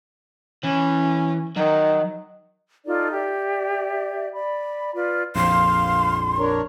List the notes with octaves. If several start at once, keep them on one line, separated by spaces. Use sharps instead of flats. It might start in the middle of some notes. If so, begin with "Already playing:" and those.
E3 C#4
D#3 F#3
D#4 F4 A4 D5
G4 D5 E5
D5 B5
F4 B4 D5
A#1 F2 F5 C6
D4 A#4 C#5